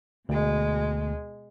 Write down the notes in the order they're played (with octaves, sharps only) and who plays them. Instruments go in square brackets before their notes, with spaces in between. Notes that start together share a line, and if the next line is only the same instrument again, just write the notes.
[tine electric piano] D2 [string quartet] B2 G#3